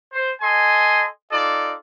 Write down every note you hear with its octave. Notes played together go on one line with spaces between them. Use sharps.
C5
A4 D#5 G#5 C6
D#4 F4 A4 D5